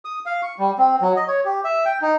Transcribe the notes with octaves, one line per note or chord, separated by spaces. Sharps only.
D#6
F5
C#6
G3
C4
F#3
D#5
C#5
G4
E5
G5
D#4